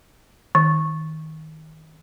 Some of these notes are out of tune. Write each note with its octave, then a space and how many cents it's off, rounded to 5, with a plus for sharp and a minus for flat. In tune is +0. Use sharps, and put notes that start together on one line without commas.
D#3 +20